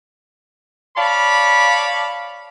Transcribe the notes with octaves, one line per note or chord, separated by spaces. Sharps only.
C#5 D5 F5 A5 B5